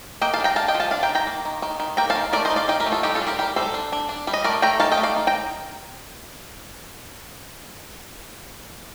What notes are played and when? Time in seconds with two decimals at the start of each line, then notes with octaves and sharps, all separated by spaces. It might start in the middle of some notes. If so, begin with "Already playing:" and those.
0.21 A#3 D#5 G5
0.33 F5 A5
0.39 D4
0.44 G5 A#5
0.56 D4 F5 A5
0.68 D#5 G5
0.74 F3
0.80 F5 A5
0.91 D4 F5 A5
1.03 G5 A#5
1.09 D#3
1.15 G5 A#5
1.27 A#3
1.45 D#3
1.62 D#3
1.80 D#3
1.97 A#3 G5 A#5
2.10 F5 A5
2.16 D#3
2.33 A3 A#4 D5
2.45 C5 D#5
2.50 D#4
2.56 D5 F5
2.68 D#4 D#5 G5
2.80 G4 A#4
2.86 A3
2.92 F4 A4
3.03 G3 D#4 G4
3.15 F4 A4
3.22 D4
3.27 G4 A#4
3.38 G3 G4 A#4
3.56 G3 A4 C5
3.74 D4
3.92 D4
4.09 D4
4.27 G3
4.33 D#5
4.44 A3 A#4 D5
4.62 A3 G5 A#5
4.80 D#4 F5 A5
4.91 D#5 G5
4.97 A3
5.03 D5 F5
5.16 D#4
5.27 G5 A#5